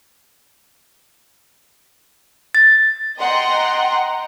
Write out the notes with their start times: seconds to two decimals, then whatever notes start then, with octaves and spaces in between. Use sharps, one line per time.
2.55 A6
3.19 D#5 F#5 G5 A#5 C6